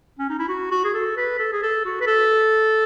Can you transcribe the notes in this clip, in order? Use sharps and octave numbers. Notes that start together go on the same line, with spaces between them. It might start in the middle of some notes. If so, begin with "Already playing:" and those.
C#4
D#4
E4
F#4
F#4
G#4
A4
B4
A4
G#4
A4
F#4
B4
A4